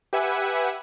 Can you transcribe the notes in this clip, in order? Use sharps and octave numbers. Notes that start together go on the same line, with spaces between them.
G4 B4 E5 F#5 G#5